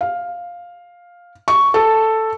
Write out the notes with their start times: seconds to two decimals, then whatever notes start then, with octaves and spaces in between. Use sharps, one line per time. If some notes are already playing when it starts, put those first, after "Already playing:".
0.01 F5
1.48 C#6
1.74 A4